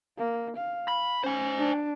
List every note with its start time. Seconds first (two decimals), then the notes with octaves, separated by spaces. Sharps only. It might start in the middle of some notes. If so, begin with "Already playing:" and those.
0.18 A#3
0.57 F5
0.88 B5
1.24 C#4 C5 G#5
1.58 D4